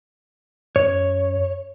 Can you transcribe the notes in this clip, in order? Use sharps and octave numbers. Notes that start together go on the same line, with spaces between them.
F#2 C#5